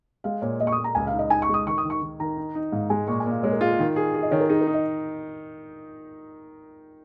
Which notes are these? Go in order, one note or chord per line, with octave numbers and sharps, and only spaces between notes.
G#3 F5
A#2 C#5
A#2 D#5
C#6
D#6
A#2
A#5
C#2 G#5
F5
D#4
D#5
D#4 G#5
C#6
G#3 D#6
D#3 C#6
D#6
D#3
C#6
D#3
D#3 A#5
D#4
D#4
G#2 F5
G#3 G#5
A#2 C#6
G#5
A#2 F5
G#3 C#5
A#4
F4 G#4
A#4
D#3
G#4
G#4
D#5
D#3 C#5
A#4
D#4 G#4
A#4
D#4
D#5